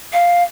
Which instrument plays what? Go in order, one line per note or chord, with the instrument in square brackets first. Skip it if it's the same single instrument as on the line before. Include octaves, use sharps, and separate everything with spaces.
[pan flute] F5